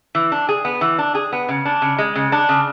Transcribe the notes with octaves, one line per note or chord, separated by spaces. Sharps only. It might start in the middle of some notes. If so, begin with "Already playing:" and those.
E3
D4
G#4
B3
E3
D4
G#4
B3
C#3
D4
C#3
G#3
C#3
D4
C#3